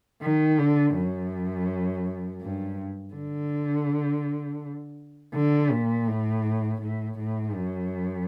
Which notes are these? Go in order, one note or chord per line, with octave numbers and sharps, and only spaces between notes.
D#3
D3
F#2
G2
D3
D3
A#2
A2
A2
A2
F#2